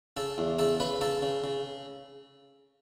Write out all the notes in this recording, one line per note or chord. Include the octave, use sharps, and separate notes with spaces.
C#3 A4 A5
E2
C#3 A4 A5
C#3 B4 B5
C#3 A4 A5
C#3
C#3